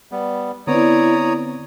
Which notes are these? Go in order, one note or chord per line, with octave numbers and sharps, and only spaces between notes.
G3 B3
D3 B3 C4 E4 C#5 D5 A#5 D#6